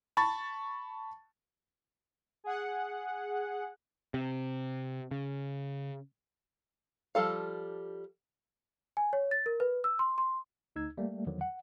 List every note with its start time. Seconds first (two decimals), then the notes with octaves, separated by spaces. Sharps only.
0.17 A5 B5 C#6 A6
2.44 G#4 F#5
4.14 C3
5.11 C#3
7.15 F3 G3 A4 F5
8.97 G#5
9.13 C#5
9.31 A6
9.46 A#4
9.60 B4
9.84 E6
9.99 C6
10.18 C6
10.76 D2 D#4 E6 G#6
10.97 G3 A3 A#3
11.26 E2 D3 D#3 F3 F#3
11.41 F#5